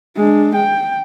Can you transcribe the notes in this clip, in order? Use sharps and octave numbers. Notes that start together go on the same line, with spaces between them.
G#3 D4
G5